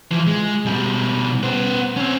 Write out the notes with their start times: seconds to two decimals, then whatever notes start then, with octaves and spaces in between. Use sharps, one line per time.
0.12 E3 F3
0.27 G#3
0.65 B2 G3
1.43 B3 C5
1.96 C4 C#4